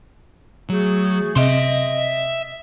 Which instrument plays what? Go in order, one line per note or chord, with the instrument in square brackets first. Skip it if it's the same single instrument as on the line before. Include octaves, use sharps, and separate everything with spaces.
[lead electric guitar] F#3 [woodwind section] A3 F#4 G#4
[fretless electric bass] C3 [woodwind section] D#5 [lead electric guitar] E5 C6